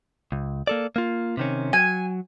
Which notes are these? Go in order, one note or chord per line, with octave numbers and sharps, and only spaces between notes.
C#2
A#3 A4 D5
A#3 F4
C3 D#3 C#4
F#3 G#5